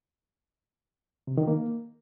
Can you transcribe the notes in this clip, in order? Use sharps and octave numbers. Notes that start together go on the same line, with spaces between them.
C3
D#3
A#3